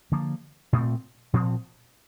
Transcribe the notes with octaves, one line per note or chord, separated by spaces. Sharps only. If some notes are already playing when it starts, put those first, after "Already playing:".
D3 F3 A#3
A#2 A3 C4
A#2 F3 C4